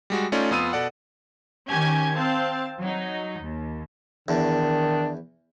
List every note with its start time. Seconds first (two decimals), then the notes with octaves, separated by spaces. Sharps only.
0.10 G3 G#3 F#4
0.32 A3 C#4 D#4 F4 D5
0.51 F2 B3 F4 D#6 E6 D#7
0.73 B2 A4 D5 F#5
1.68 D#3 C#4 G4 G#5 G#6
2.17 C4 F5 A5
2.80 F#3 D#4
3.41 D#2
4.28 E2 D#3 D4